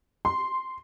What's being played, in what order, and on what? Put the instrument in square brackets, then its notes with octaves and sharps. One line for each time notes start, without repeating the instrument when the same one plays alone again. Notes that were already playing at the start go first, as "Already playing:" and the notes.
[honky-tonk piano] C6